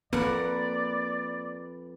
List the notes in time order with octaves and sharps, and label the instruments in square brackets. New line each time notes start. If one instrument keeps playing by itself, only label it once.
[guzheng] F2 A#4 F#5 [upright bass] A#3 [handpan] B4 [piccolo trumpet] D5